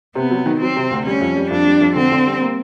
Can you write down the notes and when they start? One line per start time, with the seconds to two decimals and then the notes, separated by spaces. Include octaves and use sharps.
0.15 C3 B3
0.30 F#3
0.46 D#3
0.61 F#3 C4
0.76 C3
0.91 D2
1.06 G3 C#4
1.21 F2
1.36 G3
1.51 F2 D4
1.66 G3
1.81 F2
1.96 D3 C4
2.12 D3
2.26 G3
2.41 A#3